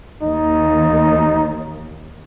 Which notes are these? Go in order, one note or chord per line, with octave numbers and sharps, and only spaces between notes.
D#2 D#4